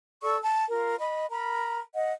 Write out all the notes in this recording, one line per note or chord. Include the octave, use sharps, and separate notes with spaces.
A4 D5 C#6 E6
A5
F4 A#4
D#5 B5
A#4 A#5 B5
D#5 F#5